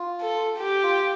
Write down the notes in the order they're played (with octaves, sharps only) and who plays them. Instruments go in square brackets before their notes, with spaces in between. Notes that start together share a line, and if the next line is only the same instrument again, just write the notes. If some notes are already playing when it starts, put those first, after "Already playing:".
Already playing: [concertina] F4
[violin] A4
G4
[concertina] F4